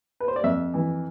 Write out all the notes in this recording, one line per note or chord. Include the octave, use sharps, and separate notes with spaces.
B4
C5
D5
F2 E5
E3